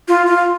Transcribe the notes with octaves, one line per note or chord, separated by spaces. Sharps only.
F4
F4